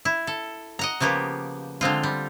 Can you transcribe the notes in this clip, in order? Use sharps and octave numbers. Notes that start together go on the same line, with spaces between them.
E4
A4
D#5 F#5 A#5
C#3 F3 A#3 B3 G4
D3 G#3 C4 F4
G3